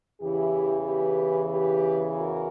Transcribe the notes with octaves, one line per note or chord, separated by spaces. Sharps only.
E2 C#3 E3 E4 G4
G4 B4
G4 B4
F#4 A#4